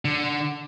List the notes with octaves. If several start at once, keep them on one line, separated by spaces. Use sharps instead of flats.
D3